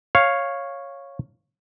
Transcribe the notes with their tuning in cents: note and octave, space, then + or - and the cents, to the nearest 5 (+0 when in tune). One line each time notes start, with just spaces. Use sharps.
C#5 -5 F5 +0